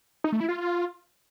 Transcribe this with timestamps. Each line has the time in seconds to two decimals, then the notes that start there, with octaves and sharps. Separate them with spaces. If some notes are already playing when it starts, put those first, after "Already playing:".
0.24 D#4
0.32 A3
0.40 E4
0.49 F4